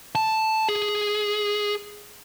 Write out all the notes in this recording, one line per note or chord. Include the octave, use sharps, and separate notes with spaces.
A5
G#4